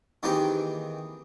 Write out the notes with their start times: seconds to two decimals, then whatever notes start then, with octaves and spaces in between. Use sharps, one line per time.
0.23 D#3 E3 A#3 C4 G4 G#4